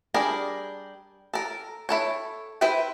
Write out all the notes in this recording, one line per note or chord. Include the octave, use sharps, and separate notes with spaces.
G3 D4 G#4 A#4
A4 A#4
E4 A4 C#5
E4 B4 C5 E5 G5